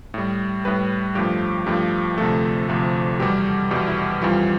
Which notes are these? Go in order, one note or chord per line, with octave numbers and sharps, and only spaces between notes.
A2 G3
A2 G3 B4
G2 F3 A3 G4
G2 F3 A3 G4
D2 C3 F3 A3 A4
D2 C3 F3 A3 G4
E2 B2 G3 G4
E2 B2 G3 G4
E4
F2 E3 G3 F4